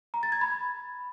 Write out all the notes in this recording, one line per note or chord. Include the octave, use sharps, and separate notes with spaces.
A#5
A6
G#6
B5